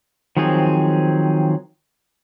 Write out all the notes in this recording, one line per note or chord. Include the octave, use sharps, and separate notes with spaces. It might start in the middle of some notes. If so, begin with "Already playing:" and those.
D#3 F3 F#3 C4 G#4